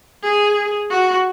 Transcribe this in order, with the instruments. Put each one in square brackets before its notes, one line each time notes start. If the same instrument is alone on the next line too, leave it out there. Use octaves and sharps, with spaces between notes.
[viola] G#4
F#4